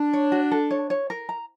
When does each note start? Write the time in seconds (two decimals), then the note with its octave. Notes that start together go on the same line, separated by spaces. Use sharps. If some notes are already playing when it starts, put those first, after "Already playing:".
Already playing: D4
0.13 C#5
0.32 F#4
0.51 A4
0.71 C#5
0.90 C#5
1.10 A#4
1.29 A#5